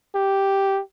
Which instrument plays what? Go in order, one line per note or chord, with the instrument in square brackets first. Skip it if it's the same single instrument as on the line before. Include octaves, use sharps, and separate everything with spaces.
[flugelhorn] G4